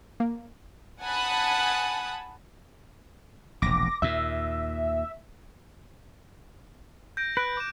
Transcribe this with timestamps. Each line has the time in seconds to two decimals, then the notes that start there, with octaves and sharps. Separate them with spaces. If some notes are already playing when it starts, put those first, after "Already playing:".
0.20 A#3
1.03 F#5 G#5 A5 B5 D#6 F#6
3.62 E1 A#1 D6 A#6
4.02 D#2 A#2 E5
7.17 G6 A#6 D7
7.37 B4 F#6 D7
7.57 D6 E7